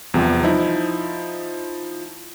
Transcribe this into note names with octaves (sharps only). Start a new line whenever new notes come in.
E2 C3 F3 G3
F3 D#4 E4